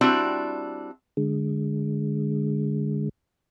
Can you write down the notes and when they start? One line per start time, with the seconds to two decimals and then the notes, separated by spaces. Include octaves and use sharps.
0.01 G3 C4 D4 E4 F#4
1.17 D3 G#3